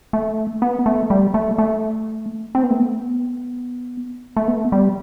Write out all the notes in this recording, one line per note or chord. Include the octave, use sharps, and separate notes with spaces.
A3
B3
A3
G3
A3
A3
C4
B3
A3
B3
A3
B3
G3